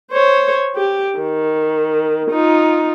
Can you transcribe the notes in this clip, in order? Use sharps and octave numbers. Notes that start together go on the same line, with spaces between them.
C5 C#5
G4
D#3
D#4 F4